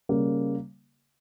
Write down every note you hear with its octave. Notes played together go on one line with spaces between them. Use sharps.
C#3 G3 A#3